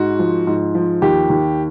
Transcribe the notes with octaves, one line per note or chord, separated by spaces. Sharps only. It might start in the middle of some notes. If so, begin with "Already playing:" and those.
Already playing: G#2 F#4
F3
G#2
F3
D#2 G4
D#2